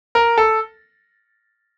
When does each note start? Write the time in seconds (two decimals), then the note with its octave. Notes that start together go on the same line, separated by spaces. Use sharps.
0.15 A#4
0.38 A4